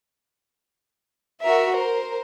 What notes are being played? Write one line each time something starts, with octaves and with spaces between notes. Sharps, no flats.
F#4 A#4 E5
A#4 C5